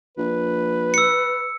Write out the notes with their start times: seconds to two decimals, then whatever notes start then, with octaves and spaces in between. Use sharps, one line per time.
0.17 A#1 B4
0.94 E6 C#7